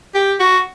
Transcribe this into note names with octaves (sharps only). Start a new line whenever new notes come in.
G4
F#4